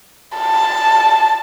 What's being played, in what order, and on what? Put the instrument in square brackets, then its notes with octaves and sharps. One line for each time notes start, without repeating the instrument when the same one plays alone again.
[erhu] A5